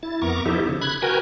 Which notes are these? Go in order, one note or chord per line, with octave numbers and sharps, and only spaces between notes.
E4 A6
F2 B3 A#4 A#5 C#6 D6
F3 B3 D#4 E4 G4 A4
C#3
B5 F#6 G#6
F#4 A#4 B4 G5 G#5 A#5